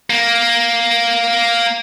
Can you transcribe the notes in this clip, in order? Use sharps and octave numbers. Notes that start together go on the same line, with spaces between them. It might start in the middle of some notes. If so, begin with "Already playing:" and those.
A#3